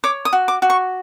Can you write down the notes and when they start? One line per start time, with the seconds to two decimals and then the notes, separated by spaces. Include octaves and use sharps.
0.04 C#5 D6
0.25 D#6
0.33 F#4
0.48 D6
0.62 F#4
0.70 C#6